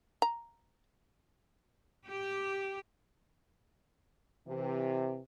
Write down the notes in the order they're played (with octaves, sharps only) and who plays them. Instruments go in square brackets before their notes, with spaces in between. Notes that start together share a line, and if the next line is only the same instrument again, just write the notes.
[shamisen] A#5
[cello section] G4
[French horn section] C3 E3